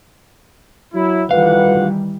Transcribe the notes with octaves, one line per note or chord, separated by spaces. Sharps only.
F#3 E4
D2 D#3 E3 G3 F4 B4 F5 F#5